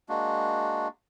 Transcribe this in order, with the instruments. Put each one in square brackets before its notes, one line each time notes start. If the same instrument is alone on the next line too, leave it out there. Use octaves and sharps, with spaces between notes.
[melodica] G#3 A#3 D4 F#4